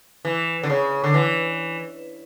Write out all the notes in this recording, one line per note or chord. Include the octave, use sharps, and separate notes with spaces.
E3
D3
C#3
D3
E3